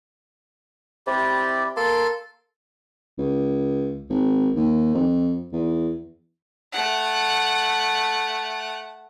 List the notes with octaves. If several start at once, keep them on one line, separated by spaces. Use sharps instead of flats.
C3 E4 G4 D5
A#3 A4 A5 C6
C#2
G#1
D#2
F2
E2
A3 F#5